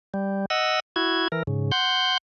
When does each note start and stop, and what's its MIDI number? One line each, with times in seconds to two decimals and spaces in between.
0.14 0.45 55
0.50 0.80 75
0.50 0.80 78
0.50 0.80 88
0.96 1.28 64
0.96 1.28 66
0.96 1.28 92
1.32 1.43 52
1.32 1.43 70
1.47 1.72 44
1.47 1.72 49
1.72 2.17 78
1.72 2.17 84
1.72 2.17 91